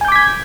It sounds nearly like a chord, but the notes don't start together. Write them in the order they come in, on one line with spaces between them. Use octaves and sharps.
G#5 G6 D6 B6 G#6